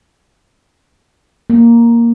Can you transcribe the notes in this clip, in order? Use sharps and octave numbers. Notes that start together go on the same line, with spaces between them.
A#3